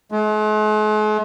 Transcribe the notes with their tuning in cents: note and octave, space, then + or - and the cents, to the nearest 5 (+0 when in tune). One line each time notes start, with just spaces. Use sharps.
G#3 +45